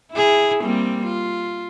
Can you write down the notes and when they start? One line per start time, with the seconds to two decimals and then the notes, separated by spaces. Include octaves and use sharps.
0.12 E4 G#4
0.62 G3 A#3 C4
1.06 F4